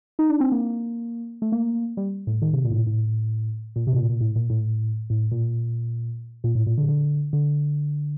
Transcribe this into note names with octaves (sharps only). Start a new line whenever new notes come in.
D#4
D4
C4
A#3
A3
A#3
G3
A2
D#3
C3
A#2
A2
A#2
A2
A#2
C3
A2
A#2
A#2
A2
A#2
A2
A2
A#2
A#2
A2
A#2
D3
D3
D3